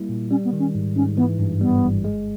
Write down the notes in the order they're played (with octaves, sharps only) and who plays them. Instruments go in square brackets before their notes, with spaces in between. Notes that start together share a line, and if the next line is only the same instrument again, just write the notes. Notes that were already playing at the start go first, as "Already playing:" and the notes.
Already playing: [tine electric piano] G3 A#3 E4
A#2
[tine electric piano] G3 [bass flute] C#4
[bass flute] B3
[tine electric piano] D#3
[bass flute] C#4
[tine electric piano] G#2
[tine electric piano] G#2 [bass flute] C#4
[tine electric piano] E3 [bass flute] B3
[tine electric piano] G2
[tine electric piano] G3 [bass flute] B3
[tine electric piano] G1
G#3